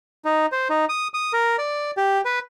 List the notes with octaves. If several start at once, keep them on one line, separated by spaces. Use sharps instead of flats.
D#4
C5
D#4
D#6
D#6
A#4
D5
G4
B4